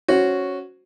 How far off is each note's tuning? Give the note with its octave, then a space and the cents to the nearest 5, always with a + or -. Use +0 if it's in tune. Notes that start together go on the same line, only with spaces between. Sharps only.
C#4 +0 F#4 +0 C5 +0